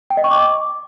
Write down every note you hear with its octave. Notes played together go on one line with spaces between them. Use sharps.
G5
D#5
C#6
D6